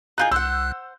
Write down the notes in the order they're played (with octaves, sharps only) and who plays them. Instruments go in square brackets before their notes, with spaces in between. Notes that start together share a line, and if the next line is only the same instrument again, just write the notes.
[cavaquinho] D#4 F4 G#4 [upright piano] F#6 G6
[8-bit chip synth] C2 F#6 [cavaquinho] C5 F#5 [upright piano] E6